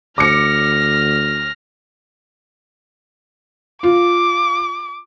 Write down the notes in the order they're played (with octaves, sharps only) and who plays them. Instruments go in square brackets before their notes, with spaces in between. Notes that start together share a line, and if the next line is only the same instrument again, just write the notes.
[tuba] D2 [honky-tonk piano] D6 C#7 [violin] F6 A#6
[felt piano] F4 [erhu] D6